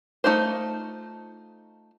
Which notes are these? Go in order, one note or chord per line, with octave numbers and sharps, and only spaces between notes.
A3 D#4 F4 C5